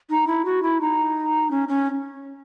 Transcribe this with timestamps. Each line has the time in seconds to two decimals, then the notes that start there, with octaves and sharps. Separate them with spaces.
0.10 D#4
0.27 E4
0.45 F#4
0.62 E4
0.81 D#4
1.51 C#4
1.68 C#4